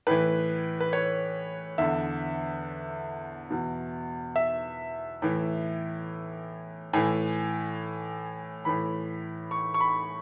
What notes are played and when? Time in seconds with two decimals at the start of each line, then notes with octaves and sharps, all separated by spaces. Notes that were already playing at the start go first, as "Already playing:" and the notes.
0.07 A2 E3 B4
0.80 B4
0.93 C#5
1.78 E2 D3 E5
3.51 E2 B2
4.36 E5
5.22 A2 E3
6.93 A2 E3 G#5
8.65 A2 E3 B5
9.51 C#6
9.74 C#6
9.81 B5